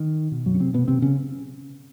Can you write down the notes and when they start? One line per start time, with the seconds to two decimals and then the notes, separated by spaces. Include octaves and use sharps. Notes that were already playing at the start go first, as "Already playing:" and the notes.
Already playing: D#3
0.32 B2
0.46 F#2 F#3
0.55 C#4
0.60 C3 C4
0.74 B2 B3
0.88 C3 C4
1.02 C#3 C#4